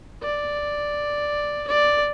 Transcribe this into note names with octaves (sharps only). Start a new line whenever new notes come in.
D5
D5